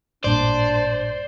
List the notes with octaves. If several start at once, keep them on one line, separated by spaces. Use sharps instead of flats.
A1 G2 A#2 D4 C5 D5